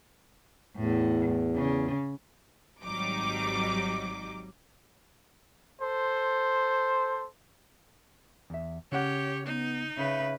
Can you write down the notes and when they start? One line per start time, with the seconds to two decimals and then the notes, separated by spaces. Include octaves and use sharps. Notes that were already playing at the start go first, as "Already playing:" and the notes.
0.77 E2 A2
1.56 C#3
2.84 G#1 F#3 G3 D#4 D6
5.82 A4 C5
8.50 E2 E5
8.92 C#3 C#4 G4 C#5 F#5
9.46 B3 D#4
9.97 C#3 B4 E5